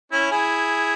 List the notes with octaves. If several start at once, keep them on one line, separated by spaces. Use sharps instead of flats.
C#4 E4
E4 G#4